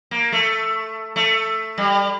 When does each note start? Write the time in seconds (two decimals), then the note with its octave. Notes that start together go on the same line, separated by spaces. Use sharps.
0.11 A#3
0.32 A3
1.16 A3
1.78 G3